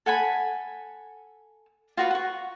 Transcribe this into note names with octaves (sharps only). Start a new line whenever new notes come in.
A4 F#5 G#5 B5
F4 F#4 B4
F#5 C#6